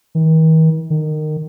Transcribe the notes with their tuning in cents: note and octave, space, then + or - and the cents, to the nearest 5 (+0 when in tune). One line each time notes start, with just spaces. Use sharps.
D#3 +45
D#3 -20